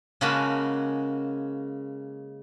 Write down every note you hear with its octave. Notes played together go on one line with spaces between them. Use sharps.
C#3 G#3 A#3 F#4 A5 B5